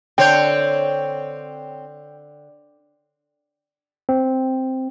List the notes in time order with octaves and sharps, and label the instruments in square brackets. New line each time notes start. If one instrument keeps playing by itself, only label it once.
[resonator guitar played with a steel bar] D3 [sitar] C4 C5 C#5 [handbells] G5 G6
[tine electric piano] C4